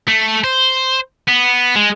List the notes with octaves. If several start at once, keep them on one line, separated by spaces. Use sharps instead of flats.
A3
C5
B3
G#3